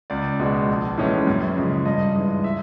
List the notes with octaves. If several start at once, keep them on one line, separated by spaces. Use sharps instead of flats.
C#2 D5
B2 G#3
A#1
A2 E3 G#3 C#4
F#2
C#3 F3 G#3
G2 D#5
E3 G#3
E5